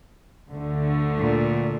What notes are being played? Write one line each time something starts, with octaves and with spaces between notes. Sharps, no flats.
D2 D3 A3
A#2